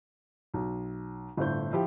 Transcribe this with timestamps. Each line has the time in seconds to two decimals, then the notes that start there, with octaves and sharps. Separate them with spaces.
0.54 B1
1.37 G1 A2 C5 G6
1.73 F3 E4 G4